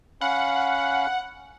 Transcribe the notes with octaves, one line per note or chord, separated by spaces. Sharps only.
C#4 F5 F#5 B5